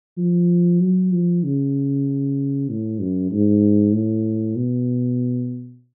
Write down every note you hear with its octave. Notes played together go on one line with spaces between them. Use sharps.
F3
F#3
F3
C#3
A2
F#2
G#2
A2
B2